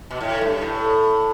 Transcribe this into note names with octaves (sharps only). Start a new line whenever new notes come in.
B2
A2
G2
A2